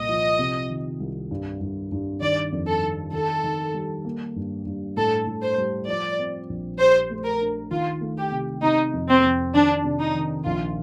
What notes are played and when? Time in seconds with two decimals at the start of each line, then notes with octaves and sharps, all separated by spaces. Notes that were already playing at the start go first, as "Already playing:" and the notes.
Already playing: C2 A#2 D#5
0.09 F3
0.39 C3
0.70 D#3
1.00 C2
1.31 G2
1.61 G2
1.92 G2
2.21 D#3 D5
2.52 F2
2.67 A4
2.83 D#3
3.13 D#3 A4
3.44 D#3
3.74 G3
4.05 A#3
4.36 G2
4.66 G2
4.97 A2 A4
5.27 A2
5.42 C5
5.58 G3
5.87 F3 D5
6.19 C4
6.49 A#1
6.79 G4 C5
7.10 A3
7.25 A#4
7.41 D4
7.71 D#3 F4
8.01 A3
8.17 G4
8.31 C3
8.62 C3 D#4
8.94 F2
9.08 C4
9.24 F2
9.54 D#3 D4
9.84 C3
10.00 D#4
10.15 D#3
10.45 A#1 F4